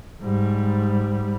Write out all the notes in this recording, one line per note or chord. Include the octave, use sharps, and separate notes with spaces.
G#2 G3